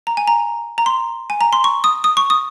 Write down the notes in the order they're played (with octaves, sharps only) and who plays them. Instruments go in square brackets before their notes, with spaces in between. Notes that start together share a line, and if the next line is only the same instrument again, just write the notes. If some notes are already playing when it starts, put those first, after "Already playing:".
[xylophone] A#5
G#5
A#5
A#5
C6
G#5
A#5
C6
C#6
D#6
D#6
C#6
D#6